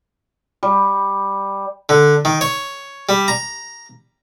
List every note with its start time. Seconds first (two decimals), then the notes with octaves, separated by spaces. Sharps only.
0.63 G3
1.89 D3
2.25 D#3
2.41 C#5
3.09 G3
3.28 A#5